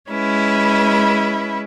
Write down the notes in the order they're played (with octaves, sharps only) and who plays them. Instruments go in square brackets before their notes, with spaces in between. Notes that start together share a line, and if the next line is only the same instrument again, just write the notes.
[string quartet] G#3 C#4 E4 B4